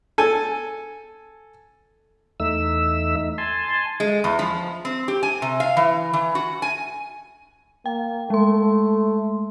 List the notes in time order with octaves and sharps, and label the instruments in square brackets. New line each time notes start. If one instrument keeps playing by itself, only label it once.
[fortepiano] A4 G#5
[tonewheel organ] E2 A3 D#4 E5 E6
D#4
G#5 A5 C6
[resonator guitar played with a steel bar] G#3
E2
F3
C4
G4
G#5
C3
F5
E3
E3
F#4
G#5
[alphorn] A#3 [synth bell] G5
[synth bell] G#3 C6 [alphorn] A3